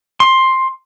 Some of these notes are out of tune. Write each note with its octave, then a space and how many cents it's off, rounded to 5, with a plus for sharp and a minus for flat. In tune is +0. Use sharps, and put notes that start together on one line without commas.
C6 +10